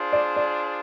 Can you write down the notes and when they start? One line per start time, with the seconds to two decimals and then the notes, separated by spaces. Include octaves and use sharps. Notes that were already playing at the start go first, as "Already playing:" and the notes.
Already playing: D4 F4 G#4 C5
0.13 D5
0.36 D5